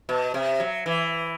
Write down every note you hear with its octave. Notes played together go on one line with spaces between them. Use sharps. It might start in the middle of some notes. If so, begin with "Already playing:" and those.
B2
C3
F#3
E3